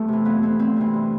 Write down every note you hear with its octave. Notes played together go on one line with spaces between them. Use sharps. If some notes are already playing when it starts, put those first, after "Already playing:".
Already playing: E2 A3 G4 A4
C3 E3
F2 B3
E3 C4
D2 C4
C3 E3
G2